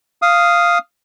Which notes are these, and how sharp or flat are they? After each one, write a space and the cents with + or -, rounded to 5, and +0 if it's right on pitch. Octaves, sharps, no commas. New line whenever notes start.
F5 -5 D#6 +0